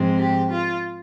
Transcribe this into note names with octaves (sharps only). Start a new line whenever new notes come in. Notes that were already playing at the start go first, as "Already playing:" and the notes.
Already playing: G#2 F3 G#3 C4
G4
F4